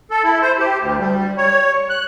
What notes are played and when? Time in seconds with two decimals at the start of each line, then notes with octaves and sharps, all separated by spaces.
0.11 A4
0.24 E4
0.42 C5
0.59 G4
0.80 D2
0.99 G3
1.37 C#5
1.90 F#6